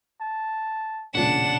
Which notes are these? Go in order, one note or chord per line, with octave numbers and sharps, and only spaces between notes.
A5
E1 A#2 C#3 D4 F#5 E7